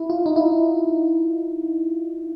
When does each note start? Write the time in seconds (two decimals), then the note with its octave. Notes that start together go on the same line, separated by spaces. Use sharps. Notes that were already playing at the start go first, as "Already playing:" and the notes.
Already playing: E4
0.10 F4
0.26 D#4
0.36 E4